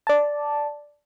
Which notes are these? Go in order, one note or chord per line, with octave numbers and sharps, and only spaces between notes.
D5 A5